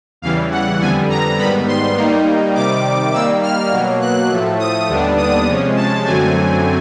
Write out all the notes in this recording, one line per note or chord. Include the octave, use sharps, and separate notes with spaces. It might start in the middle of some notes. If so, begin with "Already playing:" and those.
E2 C#3 E3 G3 F5
F#5
F2 D3 G3 B3 G#5
A#5
G#2 D#3 G3 B3 B5
C6
D#3 G3 A#3 D#4
C3 D#3 G3 D6
D#3 G3 A#3 E6
F6
B2 F#3 A#3
F#6
A2 F3 A3
D#6
D#2 D3 G3 B3 D4
D#6
C3 F3 G#3 C#4
A5
F#2 D3 F#3 A3 C4 G#5